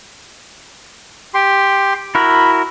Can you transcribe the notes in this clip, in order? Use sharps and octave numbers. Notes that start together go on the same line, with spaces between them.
G4 C6
E4 F#4 A#4 B5